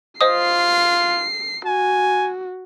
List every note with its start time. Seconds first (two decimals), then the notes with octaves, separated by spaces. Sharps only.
0.21 F4 C5 D#5 D#6 C7
1.66 F#4 G#5